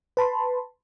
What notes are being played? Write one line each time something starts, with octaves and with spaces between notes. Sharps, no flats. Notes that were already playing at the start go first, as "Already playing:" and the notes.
B4 A5 B5 C6